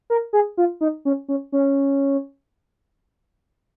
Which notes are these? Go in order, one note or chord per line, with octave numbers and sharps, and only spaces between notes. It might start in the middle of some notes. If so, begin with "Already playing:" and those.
A#4
G#4
F4
D#4
C#4
C#4
C#4